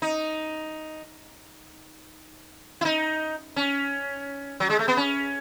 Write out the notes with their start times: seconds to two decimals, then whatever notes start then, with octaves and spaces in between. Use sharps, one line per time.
0.02 D#4
2.81 E4
2.85 D#4
3.56 C#4
4.60 F#3
4.70 G#3
4.79 A3
4.88 B3
4.97 C#4